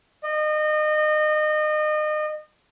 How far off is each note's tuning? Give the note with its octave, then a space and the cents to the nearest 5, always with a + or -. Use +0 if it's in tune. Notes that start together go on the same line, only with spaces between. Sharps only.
D#5 -30